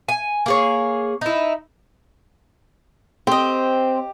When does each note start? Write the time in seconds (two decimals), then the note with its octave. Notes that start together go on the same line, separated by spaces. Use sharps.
0.09 G#5
0.46 A#3 G#4 C#5
1.21 D#4 E4
3.27 C4 G4 C5 D#5